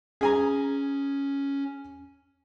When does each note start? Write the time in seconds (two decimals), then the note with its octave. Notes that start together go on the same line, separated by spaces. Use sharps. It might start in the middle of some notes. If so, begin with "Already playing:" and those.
0.21 C#4 G#4 G#5 A#5